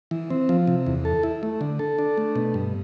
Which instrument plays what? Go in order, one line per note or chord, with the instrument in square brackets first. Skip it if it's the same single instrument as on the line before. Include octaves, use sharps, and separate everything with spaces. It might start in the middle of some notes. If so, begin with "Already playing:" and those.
[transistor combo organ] E3
C4
F3
C3
E2
A4
E4
A3
D3
A4
D4
A3
B2
G2